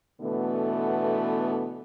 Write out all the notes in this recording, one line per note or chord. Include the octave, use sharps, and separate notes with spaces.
B2 D3 E3 A3 B3